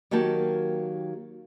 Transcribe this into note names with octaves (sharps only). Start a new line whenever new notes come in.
D#3 F#3 A#3 G4 A5